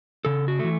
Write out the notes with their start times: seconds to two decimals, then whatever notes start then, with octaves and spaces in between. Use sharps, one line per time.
0.25 C#3 A4
0.48 F#4
0.59 E3 A3